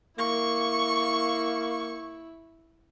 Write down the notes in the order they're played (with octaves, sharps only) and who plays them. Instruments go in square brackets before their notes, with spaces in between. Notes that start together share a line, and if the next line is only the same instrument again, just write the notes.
[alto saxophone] A#3 [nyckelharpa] E4 [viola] C#6